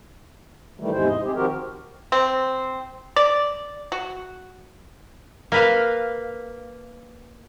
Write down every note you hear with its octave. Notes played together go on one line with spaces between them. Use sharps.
D#3 E3 G3 A3
E2 G#2 C3 G#3 E4 C5
D#5
C4 G4 G#4
D#3 F3 C4 F#4 G4 A#4
C4
D5
F#4
A#3 B4 F5